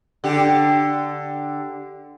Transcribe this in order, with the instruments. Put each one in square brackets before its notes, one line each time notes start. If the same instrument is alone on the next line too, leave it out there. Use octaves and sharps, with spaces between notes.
[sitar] D3 G4